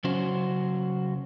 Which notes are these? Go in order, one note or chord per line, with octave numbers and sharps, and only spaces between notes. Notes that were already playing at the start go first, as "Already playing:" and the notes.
C#3 F#3 C#4 F#4 C5